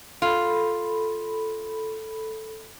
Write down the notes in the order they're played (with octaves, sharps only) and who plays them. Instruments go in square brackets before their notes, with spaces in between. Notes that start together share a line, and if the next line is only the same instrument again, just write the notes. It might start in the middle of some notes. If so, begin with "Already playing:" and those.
[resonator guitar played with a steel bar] F4 [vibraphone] A4 B5